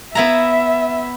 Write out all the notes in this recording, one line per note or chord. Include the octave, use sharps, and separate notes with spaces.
B3 E4 E5 A#5